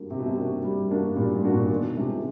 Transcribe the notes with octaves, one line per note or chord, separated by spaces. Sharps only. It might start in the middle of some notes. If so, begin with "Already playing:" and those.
Already playing: G3 A#3 D4 F#4
C3 G3
B2
C3
A#3 D4 F#4
G3
A#3 D4 F#4
A#2 G3
A2
A#3 D4 F#4
A#2
B2 D#3
C3 G#3 B3 D4 F4